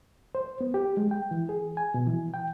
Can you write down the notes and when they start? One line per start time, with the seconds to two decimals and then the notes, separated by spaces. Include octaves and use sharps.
0.35 C5
0.61 B3
0.74 G4
0.97 G#3
1.11 G5
1.31 E3
1.49 G#4
1.77 G#5
1.94 B2
2.06 E3
2.34 G5